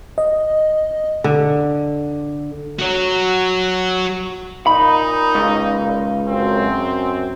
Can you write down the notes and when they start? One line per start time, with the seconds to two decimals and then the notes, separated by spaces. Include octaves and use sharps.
0.18 D#5
1.24 D3
2.79 F#4 C#5
4.67 A#2 D#4 B5
5.35 C#2
6.28 F#2 C4